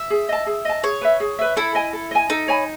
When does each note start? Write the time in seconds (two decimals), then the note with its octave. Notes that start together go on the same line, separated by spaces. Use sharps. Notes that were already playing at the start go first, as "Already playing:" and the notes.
Already playing: E5
0.10 G#4
0.29 D#5 A5
0.46 G#4
0.65 D#5 A5
0.83 G#4 C#5
1.01 B4 E5
1.20 G#4
1.39 B4 E5
1.56 E4 A4
1.75 D#5 G#5
1.93 A4
2.11 D#5 G#5
2.30 D#4 A4
2.48 C#5 G#5 B5